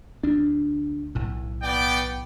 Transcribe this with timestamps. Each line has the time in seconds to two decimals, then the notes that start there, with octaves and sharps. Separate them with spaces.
0.23 D2 D4
1.15 B1 A2
1.62 B3 D5 G5